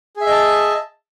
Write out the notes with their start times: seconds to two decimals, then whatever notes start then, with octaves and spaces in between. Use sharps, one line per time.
0.16 G#4
0.21 E5
0.26 D#5
0.31 A5